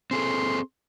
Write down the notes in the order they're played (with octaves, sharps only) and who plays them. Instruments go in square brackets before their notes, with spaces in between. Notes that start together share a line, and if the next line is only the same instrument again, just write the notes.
[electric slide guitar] C4 G#4 A4 [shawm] C6